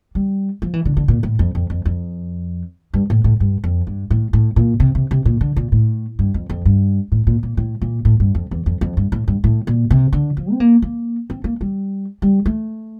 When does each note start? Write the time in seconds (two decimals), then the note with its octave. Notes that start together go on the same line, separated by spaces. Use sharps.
0.15 G3
0.62 F3
0.74 E3
0.85 D3
0.97 D3
1.08 A#2
1.23 A2
1.39 F2
1.55 F2
1.70 F2
1.86 F2
2.94 G2
3.10 A2
3.24 A2
3.40 G2
3.64 F2
3.87 G2
4.10 A2
4.33 A2
4.56 A#2
4.80 C3
4.95 C3
5.11 C3
5.25 A#2
5.41 D3
5.56 A#2
5.72 A2
6.19 G2
6.34 F2
6.50 F2
6.65 G2
7.12 A2
7.27 A#2
7.43 A#2
7.57 A2
7.82 A#2
8.05 A2
8.20 G2
8.35 F2
8.51 E2
8.66 F2
8.81 F2
8.97 G2
9.12 A2
9.28 G2
9.44 A2
9.67 A#2
9.91 C3
10.13 D3
10.37 F3
10.52 C4
10.60 A#3
10.82 A#3
11.30 C4
11.44 A#3
11.61 G3
12.22 G3
12.46 A3